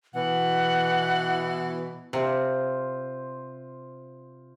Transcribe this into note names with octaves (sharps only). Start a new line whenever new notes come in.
B2 E3 F#5
C3 F4 C5